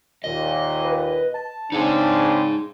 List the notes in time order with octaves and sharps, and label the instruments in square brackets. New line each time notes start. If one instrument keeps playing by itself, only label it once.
[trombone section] D#2 A#2 [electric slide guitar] D#5
[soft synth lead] B4
A5
[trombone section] C#3 C4 D4 [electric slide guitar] D#4 G#4